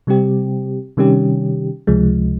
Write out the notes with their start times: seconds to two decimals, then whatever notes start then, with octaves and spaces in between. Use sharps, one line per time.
0.07 C3 G3 C4 G4
0.97 C3 D#3 G3 C#4 G4
1.87 C#2 C3 F3 G#3